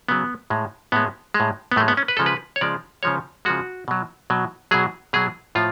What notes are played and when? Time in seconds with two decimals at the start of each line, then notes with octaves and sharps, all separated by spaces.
0.09 C#3 F#3 B3
0.50 A2 G#3
0.92 A2 G#3 B3
1.34 G#3
1.40 A2
1.72 B3
1.76 A2 A3
1.80 G#3
1.88 B3
1.97 C#4
2.08 B4
2.17 C#3 F3 G#3 A4
2.26 B4
2.56 C#5
2.61 C#3 F3 G#3 D5
3.03 C#3 F3 G#3 C#5
3.45 C#3 F3 G#3 F#4
3.88 B2 F#3
4.30 B2 F#3
4.71 B2 F#3 G#4
5.13 B2 F#3 G#4
5.55 A2 F3 F4